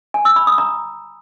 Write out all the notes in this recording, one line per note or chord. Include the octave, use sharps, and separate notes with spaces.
G#5
E6
B5
D#6
A#5